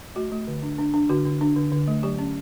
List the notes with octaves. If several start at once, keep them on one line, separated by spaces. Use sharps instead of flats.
A3 F#4
A3
D3
D4
D4
D4
D3 F#4
D3
D4
D3
D3
A3
F#3 G4
C#4